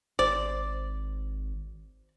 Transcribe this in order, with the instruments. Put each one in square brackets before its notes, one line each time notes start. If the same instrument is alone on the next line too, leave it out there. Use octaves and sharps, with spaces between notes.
[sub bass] G#1 [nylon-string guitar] C5 [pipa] D5